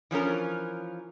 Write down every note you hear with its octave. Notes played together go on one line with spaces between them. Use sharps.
E3 F3 C#4 A#4